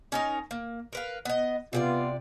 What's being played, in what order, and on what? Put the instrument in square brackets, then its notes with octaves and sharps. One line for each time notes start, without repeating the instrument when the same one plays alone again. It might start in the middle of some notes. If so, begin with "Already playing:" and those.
[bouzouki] C#4 D#4 A#4
A#3
A#4 B4 F5
B3 D#5
[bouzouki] C3 G4 D5 [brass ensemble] B3 F4